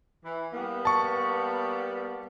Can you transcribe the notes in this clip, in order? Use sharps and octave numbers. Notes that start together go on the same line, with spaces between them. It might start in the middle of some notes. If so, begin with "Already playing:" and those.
E3
G3 A#3 B3
A5 C#6